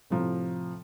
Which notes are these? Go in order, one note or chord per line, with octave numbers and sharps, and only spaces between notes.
A2 C3 F3 A#5